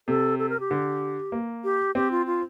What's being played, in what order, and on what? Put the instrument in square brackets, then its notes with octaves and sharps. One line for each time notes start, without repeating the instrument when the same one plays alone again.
[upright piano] C3 [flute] A4
[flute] A4
A#4
G4
[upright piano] D3
A#3
[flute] G4
[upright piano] C4 [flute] G4
[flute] F4
F4